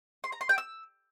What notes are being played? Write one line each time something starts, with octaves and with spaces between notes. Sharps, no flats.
C6
A#5
C6
G5
E6